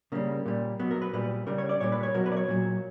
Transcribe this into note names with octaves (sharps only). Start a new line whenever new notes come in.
C#3 G3 A#3
A#2 G3
B2 F#3 B3
A#4
B4
A#2 G3 B4
C#3 G3 A#4
C#5
D5
A#2 G3 C#5
B4
C#5
B2 F#3 A#4
B4
D5
C#5
A#2 F#3